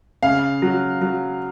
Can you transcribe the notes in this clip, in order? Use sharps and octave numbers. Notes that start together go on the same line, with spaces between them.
C#3 F5
F#3
F#3